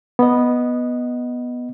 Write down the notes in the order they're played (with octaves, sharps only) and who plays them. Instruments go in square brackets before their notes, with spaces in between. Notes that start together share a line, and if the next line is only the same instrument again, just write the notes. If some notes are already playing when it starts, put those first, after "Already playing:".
[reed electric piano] B3 D#5